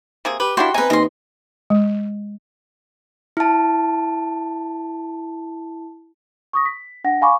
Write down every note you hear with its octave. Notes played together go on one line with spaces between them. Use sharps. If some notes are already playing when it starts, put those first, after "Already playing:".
C3 A#3 G#4
G4 B4
A#3 D4 E4 F#4 G5 C6
B3 C4 D#4 B4 G#5
D#2 D#5 C6
G#3
E4 A5
C#6 D#6 A#6
B6
D4 F#5 A#6
F5 G#5 B5 C#6 D6